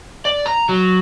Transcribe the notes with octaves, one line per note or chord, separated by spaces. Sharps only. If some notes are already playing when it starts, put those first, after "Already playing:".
D5
A#5
F#3